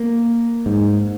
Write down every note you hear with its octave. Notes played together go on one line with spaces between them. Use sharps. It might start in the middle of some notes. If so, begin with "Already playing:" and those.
Already playing: A#3
G#2